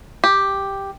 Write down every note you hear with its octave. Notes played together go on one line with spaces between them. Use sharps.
G4